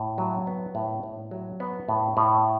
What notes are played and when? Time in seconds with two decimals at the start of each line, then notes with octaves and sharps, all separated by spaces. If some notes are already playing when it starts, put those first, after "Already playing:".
Already playing: A2
0.18 F#3
0.47 B3
0.75 A2
1.03 A2
1.31 F#3
1.60 B3
1.89 A2
2.17 A2